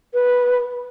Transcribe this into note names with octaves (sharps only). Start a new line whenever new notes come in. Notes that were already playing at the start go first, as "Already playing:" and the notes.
B4